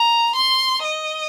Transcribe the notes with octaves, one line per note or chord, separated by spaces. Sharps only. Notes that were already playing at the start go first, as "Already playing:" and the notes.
Already playing: A#5
C6
D#5